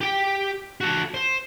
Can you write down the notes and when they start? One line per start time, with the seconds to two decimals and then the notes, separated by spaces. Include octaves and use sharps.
0.01 G4 G5
0.81 F#4 A4
1.14 C5